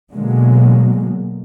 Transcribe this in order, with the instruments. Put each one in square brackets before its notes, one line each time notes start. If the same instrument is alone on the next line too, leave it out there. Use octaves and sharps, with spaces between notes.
[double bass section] B2 D3 F#3 G#3 A#3